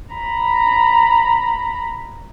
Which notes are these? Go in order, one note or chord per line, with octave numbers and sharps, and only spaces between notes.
A#5 B5